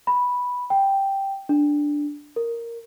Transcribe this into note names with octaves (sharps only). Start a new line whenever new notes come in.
B5
G5
D4
A#4